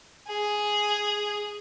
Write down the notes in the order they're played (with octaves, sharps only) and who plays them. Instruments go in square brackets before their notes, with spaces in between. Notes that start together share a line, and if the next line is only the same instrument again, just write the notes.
[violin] G#4